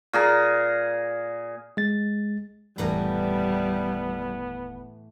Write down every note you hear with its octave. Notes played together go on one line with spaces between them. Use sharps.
A#2 G#4 A#5
G#3 A6
F1 D#2 A2 E3 G3 B3 A#5